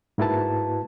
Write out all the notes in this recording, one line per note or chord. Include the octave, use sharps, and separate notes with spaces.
G#2 A#3 E4 F#4 B4 A5